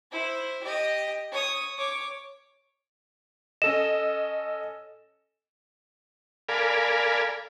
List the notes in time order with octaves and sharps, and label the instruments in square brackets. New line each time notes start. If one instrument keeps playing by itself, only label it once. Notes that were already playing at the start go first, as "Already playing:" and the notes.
[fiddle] E4 C5
G4 D#5
C#5 D#6
C#5 D6
[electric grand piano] C#4 A4 D#5 [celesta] E7
[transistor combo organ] A4 A#4 D5 F5 G#5 B5